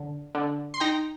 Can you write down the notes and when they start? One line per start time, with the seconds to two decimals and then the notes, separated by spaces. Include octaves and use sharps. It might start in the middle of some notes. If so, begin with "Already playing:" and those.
Already playing: D3
0.35 D3
0.74 C6
0.80 D#4 G5 A#5